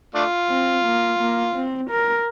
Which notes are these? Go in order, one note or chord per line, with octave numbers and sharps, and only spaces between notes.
A3 D4 F4
C4
A#3
A#3
C4
A#4